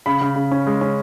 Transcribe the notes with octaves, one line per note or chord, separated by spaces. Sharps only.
C#3 B5
C#3
C#3
C#4
G#3
C#4